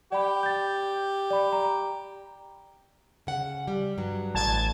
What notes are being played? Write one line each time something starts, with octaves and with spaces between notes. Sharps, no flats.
G4 D5 B5
G6 A6
D5 B5
A#5
C#3 F#5
G3
G2 F#3
A1 A5 G#6